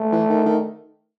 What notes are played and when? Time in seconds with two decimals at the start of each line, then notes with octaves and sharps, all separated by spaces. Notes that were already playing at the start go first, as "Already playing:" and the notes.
Already playing: A3
0.12 E3
0.29 D#3
0.46 D#3